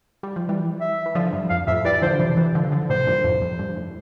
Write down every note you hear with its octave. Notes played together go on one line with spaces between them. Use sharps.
G3
F3
E3 G3
E5
E3
D3 F3
G2
F2 F5
F2 A2 E5
E3 G3 D5
D3 F3 C5
C3 E3
C3 E3
D3 F3
D3 F3
A2 C3 C5
G2 A#2
F2 A2
F2
G2
A2